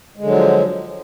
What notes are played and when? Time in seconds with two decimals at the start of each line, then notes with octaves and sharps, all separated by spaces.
0.16 G#3
0.21 D3
0.25 F#3
0.30 F3